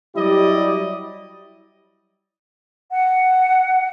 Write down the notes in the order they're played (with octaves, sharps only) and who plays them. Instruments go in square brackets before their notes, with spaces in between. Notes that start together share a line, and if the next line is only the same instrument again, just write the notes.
[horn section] F#3 G3 E4 G4 D5 D#5
[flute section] F#5